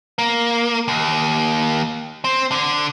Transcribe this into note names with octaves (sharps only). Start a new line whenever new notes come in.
A#3
D#2
C4
D3